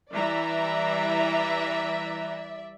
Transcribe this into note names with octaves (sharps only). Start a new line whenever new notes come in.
E3 G3 D5 E5 A#5